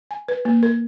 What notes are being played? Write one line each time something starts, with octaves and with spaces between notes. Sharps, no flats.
G#5
B4
A#3
A#4